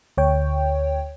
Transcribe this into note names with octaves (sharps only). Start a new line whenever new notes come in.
D2 C#5 G5